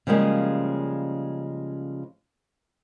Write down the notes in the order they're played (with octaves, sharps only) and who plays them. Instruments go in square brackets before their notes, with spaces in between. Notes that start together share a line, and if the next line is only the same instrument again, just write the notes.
[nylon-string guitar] C#3 F3 G3 G#3 A#3 C#4